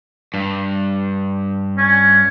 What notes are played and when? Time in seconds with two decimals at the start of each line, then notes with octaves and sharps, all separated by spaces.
0.34 G2
1.77 C#4